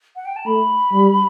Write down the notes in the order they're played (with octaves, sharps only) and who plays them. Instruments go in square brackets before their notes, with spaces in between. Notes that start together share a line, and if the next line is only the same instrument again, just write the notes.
[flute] F#5
G5
A5
[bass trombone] A3 [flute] B5
[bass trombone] G3